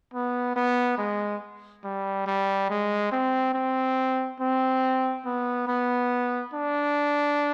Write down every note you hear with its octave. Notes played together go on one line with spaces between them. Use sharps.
B3
B3
G#3
G3
G3
G#3
C4
C4
C4
B3
B3
D4